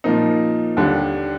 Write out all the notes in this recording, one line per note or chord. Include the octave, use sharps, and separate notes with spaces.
A#2 F3 A#3 D#4
D#2 D3 G3 D4